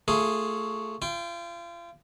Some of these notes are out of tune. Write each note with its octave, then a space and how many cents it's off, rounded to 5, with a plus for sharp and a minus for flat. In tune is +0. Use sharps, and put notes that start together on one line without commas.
A3 +15 F4 +0 G#4 +0
F4 -35 G5 +0